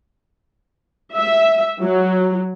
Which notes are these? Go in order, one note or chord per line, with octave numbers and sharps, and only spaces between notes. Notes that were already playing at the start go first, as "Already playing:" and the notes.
E5
F#3